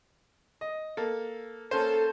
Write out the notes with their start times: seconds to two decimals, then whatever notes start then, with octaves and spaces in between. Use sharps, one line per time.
0.61 D#5
0.97 A#3 A4
1.71 A#3 C#4 A4 C5